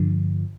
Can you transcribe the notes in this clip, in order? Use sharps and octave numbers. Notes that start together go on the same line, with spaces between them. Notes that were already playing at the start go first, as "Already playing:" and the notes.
Already playing: G2 D3 F3